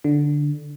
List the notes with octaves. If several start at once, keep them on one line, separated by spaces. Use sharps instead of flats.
D3